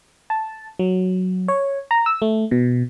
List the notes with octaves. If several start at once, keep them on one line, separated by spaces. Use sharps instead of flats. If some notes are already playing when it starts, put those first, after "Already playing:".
A5
F#3
C#5
A#5
E6
A3
B2